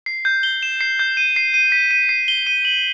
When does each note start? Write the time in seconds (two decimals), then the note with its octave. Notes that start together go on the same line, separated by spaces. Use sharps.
0.06 C7
0.25 G6
0.43 G7
0.63 E7
0.81 C7
0.99 G6
1.17 D#7
1.36 C7
1.54 D#7
1.72 B6
1.91 D#7
2.09 C7
2.28 G7
2.47 D#7
2.65 F#7